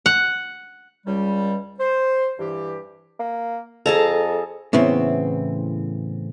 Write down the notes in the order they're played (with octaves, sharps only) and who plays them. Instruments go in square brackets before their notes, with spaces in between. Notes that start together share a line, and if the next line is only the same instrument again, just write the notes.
[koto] F#5
[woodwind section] C#2 G3
C5
G2 E3 G4
[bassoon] A#3
[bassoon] F2 [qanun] G#4 A5 A#5 [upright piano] A4
[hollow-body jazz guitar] A2 C#3 E3 B3 C4